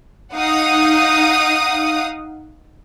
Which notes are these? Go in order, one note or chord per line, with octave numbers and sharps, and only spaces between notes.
D#4 F5 F#5 D#6